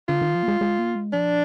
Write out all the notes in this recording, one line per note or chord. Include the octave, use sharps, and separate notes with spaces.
D3 F4
D#3
F3
A#3
G#3
G#3
A#3
G#3
F3 D4